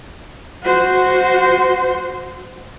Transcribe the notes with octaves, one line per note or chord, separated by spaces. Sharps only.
F#4 C5